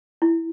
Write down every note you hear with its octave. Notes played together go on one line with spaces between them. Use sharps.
E4